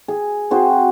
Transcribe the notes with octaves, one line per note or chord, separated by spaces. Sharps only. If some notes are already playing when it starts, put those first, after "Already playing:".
G#4
C4 F#4 G#4 C5